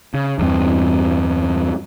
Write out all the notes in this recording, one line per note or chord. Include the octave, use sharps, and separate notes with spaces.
C#3
E2 G2 C4